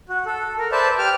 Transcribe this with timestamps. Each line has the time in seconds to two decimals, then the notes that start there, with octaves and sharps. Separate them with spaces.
0.09 F#4
0.26 A4
0.58 A#4
0.72 B4 C5 D5 E5 A5
0.99 G4 D6 F6